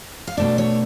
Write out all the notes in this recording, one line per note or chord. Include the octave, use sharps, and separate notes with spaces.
F5
B2 A3 D4 D5
C#5